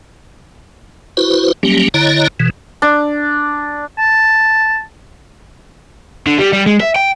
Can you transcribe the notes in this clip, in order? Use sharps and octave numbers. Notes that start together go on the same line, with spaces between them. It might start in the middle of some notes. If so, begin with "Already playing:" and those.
E4 F#4 B4 C5
F#3 G3 A#3 C#4 G4
D3 E4 C#5 D#5 A#5
B2 E3
D4
A5
D3
G3
G3
G#3
E5
G5